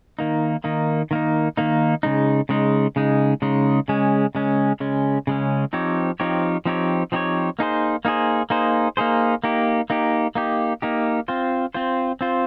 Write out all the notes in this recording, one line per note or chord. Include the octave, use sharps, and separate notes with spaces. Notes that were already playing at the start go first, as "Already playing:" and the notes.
D#3 A#3 D#4
D#3 A#3 D#4
D#3 A#3 D#4
D#3 A#3 D#4
C#3 G#3 D#4
C#3 G#3 D#4
C#3 G#3 D#4
C#3 G#3 D#4
C#3 G#3 C#4
C#3 G#3 C#4
C#3 G#3 C#4
C#3 G#3 C#4
F3 C4 D#4 G4 C#5
F3 C4 D#4 G4 C#5
F3 C4 D#4 G4 C#5
F3 C4 D#4 G4 C#5
A#3 D#4 G#4 C5
A#3 D#4 G#4 C5
A#3 D#4 G#4 C5
A#3 D#4 G#4 C5
A#3 D#4 G4
A#3 D#4 G4
A#3 D#4 G4
A#3 D#4 G4
C4 F4 C5
C4 F4 C5
C4 F4 C5